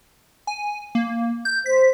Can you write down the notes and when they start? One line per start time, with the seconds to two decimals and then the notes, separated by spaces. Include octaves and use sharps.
0.47 G#5
0.95 A#3
1.45 G6
1.66 C5 B6